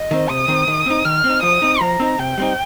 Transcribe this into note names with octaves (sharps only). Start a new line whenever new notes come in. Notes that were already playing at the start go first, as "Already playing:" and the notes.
Already playing: D#5
D#3 C4
C3 D#6
D#3 C4
D#3
C4 D#4
D#3 F6
C4
D#4
F3 D#6
C4 D#4
F3 A#5
C4 D#4
C3 G5
G3 C4 D#4